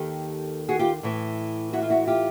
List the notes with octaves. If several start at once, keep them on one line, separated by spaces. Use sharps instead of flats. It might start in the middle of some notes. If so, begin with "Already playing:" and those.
Already playing: D#2 D#3 G4 A4
F#4 G#4
F4 G4
A2 E3
E4 F#4
F4
E4 F#4
F4 G4